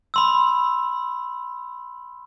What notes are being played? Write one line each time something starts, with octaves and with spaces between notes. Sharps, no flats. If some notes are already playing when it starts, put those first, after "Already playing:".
B5 C6 E6